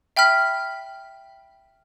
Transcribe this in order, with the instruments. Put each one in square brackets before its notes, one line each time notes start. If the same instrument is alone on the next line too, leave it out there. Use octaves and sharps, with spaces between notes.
[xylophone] E5 G5 B5 F6 B6